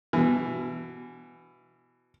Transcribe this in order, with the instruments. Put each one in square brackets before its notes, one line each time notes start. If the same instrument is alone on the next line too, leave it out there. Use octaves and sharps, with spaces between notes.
[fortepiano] B2 E3